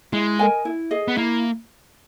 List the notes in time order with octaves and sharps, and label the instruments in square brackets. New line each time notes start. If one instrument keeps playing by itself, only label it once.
[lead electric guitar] G#3 [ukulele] E4
[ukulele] A#4 D#5 G#5
E4
G#4 D#5
[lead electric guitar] B3
[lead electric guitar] A#3 [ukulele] E4